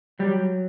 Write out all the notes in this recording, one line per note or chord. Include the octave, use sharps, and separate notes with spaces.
F#3 G3